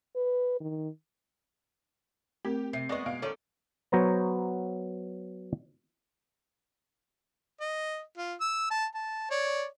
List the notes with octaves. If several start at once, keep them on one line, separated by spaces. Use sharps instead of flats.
B4
D#3
A3 C4 G4 A#4
C3 C7
G#3 B3 D5 D#5 C#6
B2 F5 D7
D#3 C#4 A4 D5
F#3 B3 C5 C#5 A#5
D#5
F4
E6
A5
A5
C#5 D5